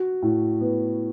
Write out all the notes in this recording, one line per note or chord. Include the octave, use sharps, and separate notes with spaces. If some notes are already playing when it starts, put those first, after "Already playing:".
Already playing: F#4
A2
B3